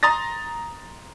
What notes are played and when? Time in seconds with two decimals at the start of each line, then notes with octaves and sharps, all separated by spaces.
0.03 A#5 C6 D#6 A6 A#6